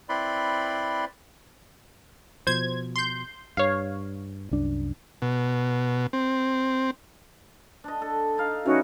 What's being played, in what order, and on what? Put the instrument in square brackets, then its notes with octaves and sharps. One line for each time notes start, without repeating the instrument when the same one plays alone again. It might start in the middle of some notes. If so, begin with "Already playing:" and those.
[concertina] C4 E4 B4 D5 B5 C6
[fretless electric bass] B2 F3 [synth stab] C5 G#6
[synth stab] C6 G6
[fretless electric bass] G2 [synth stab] C#5 F5
[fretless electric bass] C2 F#2 D4
[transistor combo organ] B2
C4
[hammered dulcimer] D4 D#5
A4
D#4 F5
[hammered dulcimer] E3 G3 [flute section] C#4 D#4 F#4